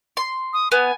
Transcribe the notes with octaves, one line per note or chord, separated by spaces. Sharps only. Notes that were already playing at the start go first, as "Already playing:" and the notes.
C6
D#6
B3 G#5